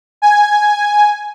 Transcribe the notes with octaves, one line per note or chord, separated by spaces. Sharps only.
G#5